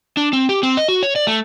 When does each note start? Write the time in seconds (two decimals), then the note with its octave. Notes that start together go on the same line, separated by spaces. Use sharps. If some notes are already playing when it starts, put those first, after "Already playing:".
0.17 D4
0.33 C4
0.49 G4
0.63 C4
0.77 D#5
0.88 F#4
1.03 C#5
1.16 D5
1.27 A3